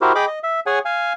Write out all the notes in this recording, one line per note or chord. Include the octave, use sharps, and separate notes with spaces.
E4 F#4 G4 A#4 C5
G#4 D#5 G5 B5 D6
D#5
E5
G#4 C#5 F#5 G#5
F5 G#5